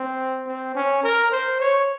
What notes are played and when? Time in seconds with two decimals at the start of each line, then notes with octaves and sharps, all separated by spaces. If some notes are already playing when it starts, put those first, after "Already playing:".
Already playing: C4
0.47 C4
0.75 C#4
1.03 A#4
1.31 C5
1.60 C#5